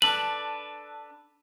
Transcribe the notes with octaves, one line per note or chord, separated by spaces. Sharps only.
D4 A4 B4 F#7